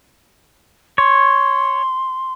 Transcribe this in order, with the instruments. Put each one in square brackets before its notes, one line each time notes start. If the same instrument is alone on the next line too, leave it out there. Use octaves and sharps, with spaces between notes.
[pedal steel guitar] C#5 [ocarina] C6